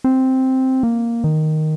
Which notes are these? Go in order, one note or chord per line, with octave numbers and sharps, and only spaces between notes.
C4
A#3
D#3